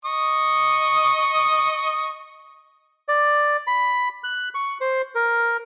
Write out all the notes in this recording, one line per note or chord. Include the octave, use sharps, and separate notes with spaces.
D#5 C#6 D#6
D5
B5
F#6
C#6
C5
A#4